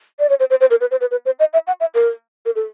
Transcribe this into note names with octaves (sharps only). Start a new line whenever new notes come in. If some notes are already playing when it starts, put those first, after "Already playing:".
D5
C#5
C5
C5
C5
A#4
B4
C5
B4
B4
C5
D#5
E5
F#5
E5
A#4
A#4
A4